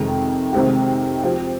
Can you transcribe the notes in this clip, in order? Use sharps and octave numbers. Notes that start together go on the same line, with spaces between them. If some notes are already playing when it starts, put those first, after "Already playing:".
Already playing: F2 C3 D#3 G#3
C3 D#3 G#3 C4 G4
F3 C4 G4